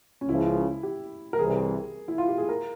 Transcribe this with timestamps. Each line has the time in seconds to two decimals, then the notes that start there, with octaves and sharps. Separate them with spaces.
0.21 C#4
0.28 C#2 C#3 F3 E4
0.83 G4
1.33 A#4
1.38 C2 C3 E3 G#4
2.08 E4
2.18 F4
2.28 G4
2.38 G#4
2.49 A#4